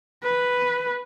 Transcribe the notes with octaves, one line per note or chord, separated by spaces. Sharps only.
B4